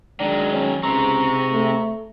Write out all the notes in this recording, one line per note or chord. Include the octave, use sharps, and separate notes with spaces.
D#3 F#3 G#3 D4
C#4
C#2 G#2 C3 C4 A#5 C#6
A3